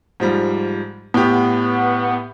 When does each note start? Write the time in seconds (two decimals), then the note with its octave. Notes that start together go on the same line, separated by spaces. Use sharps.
0.20 G#2 F3 G3
1.14 A2 B3 G4